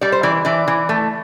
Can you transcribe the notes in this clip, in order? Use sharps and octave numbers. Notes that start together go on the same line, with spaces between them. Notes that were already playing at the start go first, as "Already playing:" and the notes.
G3 D5
C5
E3 D5
E3 D5
E3
A3